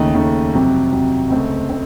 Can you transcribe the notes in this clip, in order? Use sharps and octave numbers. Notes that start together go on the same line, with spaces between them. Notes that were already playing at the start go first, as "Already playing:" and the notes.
Already playing: D#2 C#3 A3 D#4
D#2 C#3 A3 D#4
F2 C3 F#3
F2 C3 F#3
C#2 C#3 A3 C4
C#3 A3 C4